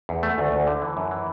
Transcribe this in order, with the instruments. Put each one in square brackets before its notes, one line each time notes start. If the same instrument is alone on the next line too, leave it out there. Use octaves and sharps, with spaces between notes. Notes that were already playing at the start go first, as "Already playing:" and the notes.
[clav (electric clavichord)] E2
A3
D2
D2
D3
E3
F#2
E3